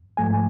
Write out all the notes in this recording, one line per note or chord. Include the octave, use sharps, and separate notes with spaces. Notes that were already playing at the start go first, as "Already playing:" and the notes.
G#2 F3 A3 G#5